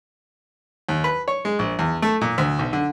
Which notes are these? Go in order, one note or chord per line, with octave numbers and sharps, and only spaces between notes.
D#2
B4
C#5
G#3
A#1
E2
A3
A#2
D2
B1
D3